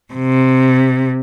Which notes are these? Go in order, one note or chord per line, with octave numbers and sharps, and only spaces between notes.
C3